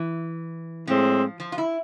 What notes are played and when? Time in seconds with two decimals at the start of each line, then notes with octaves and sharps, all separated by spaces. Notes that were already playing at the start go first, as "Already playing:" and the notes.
Already playing: E3
0.87 A2 F3 G#3 C4
1.40 F3
1.52 F4
1.58 E4